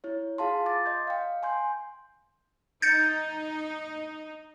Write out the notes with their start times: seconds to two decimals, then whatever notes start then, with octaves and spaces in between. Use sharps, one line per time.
0.04 E4 C#5
0.38 F4 G#4 F5 A5 C6
0.66 D6 A6
0.86 D#5 C6 G6
1.07 F5 G5
1.43 G#5 C6 G6
2.82 D#4 G6 A6 C#7